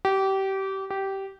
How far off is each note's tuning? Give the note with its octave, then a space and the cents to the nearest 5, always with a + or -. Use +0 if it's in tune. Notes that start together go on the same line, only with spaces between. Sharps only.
G4 -25
G4 -15